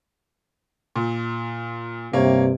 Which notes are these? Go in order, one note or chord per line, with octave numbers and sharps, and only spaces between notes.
A#2
G2 C3 A#3 C#5